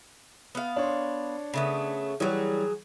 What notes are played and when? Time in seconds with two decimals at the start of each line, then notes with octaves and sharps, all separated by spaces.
0.55 B3 F5
0.76 D4 C#5 C6
1.54 C#3 A3 B3
2.20 E3 F#3 G3 G#4 C#5